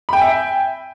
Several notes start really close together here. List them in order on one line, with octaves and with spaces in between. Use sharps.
B5 G5 G#5 E5